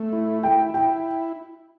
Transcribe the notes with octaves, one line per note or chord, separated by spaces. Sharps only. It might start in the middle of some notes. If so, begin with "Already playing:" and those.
Already playing: A3
E4
E4 G5
E4 G5